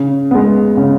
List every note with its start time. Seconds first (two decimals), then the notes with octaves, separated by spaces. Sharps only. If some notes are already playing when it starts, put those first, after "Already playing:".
Already playing: C#3
0.31 G#3 B3
0.77 C#3